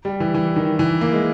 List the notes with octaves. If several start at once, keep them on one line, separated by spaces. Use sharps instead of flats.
G3
E3
E3
D#3
E3
A#3
G#3